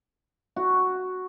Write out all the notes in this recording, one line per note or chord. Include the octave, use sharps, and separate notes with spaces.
F#4